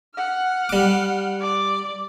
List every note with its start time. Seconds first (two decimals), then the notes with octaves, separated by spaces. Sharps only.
0.15 F#5 F6
0.69 G3 D6
1.41 D5